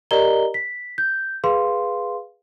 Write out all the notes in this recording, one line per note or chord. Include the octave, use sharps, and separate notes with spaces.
G4 A#4 D5 D#5 A#5 G7
B6
G6
G#4 B4 F5 C6